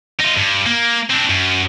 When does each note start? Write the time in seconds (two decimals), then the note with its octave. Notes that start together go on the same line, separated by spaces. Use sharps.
0.20 D#4 F4
0.37 G2
0.66 A#3
1.10 C4 D4
1.30 F#2